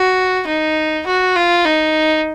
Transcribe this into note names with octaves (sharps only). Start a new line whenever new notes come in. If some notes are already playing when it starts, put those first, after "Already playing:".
Already playing: F#4
D#4
F#4
F4
D#4